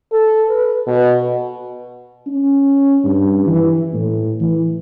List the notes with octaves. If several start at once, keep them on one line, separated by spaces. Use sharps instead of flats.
A4
B4
B2
C#4
G2
E3
A2
E3